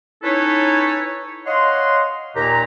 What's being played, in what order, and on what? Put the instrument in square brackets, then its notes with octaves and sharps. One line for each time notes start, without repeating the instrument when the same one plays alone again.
[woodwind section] C#4 D#4 E4 A4 B4 C#5
C#5 D#5 F5 F#5 C6
D#2 A#2 A#3 G4 A#5